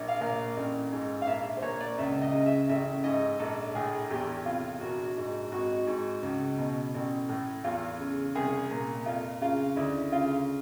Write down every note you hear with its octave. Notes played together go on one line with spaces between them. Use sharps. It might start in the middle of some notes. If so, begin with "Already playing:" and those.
Already playing: A#1
F5
A#2
A1
G#2
F5
A#1 E5
C5
A#2 C#5
D5
C#2 E5
D#5
C#3
E5
A1 E5
G#2 D#5
A#1 A4
A2 G#4
E2 G4
C3 F4
A#1 F#4
G#2
G#1 F#4
G#2
C#2
B2
A1
A2
E2 F4
C#3
C2 G#4
A#2
F2 F4
C#3 F4
D2 E4
C#3 F4